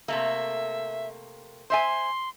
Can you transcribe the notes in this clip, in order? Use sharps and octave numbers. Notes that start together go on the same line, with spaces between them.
C3 A3 A#3 E5
C5 E5 G#5 C6